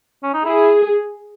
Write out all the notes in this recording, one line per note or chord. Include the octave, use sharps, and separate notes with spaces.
C#4
D#4
E4 G#4